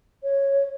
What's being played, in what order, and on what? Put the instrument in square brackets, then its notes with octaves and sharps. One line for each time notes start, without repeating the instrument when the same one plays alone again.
[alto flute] C#5